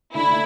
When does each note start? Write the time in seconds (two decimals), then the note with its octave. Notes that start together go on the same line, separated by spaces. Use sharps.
0.14 D3 A3 D4 E4